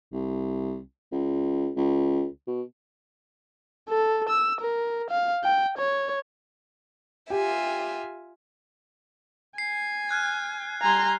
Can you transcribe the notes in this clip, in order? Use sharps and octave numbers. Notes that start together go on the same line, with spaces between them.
C2
C#2
C#2
B2
A4
E6
A#4
F5
G5
C#5
F4 G4 E5 G#5
G#5 C7
F6 F#6 G#6
G3 G#5 A#5 C6